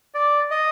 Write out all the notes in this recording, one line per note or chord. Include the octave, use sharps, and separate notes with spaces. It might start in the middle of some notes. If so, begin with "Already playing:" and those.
D5
D#5